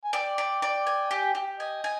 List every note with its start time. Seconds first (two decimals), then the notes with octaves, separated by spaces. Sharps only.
0.04 G#5
0.13 D5 G5
0.38 D5
0.62 D5
0.87 G#5
1.11 G4
1.35 G4
1.59 D#5 G#5
1.84 G#5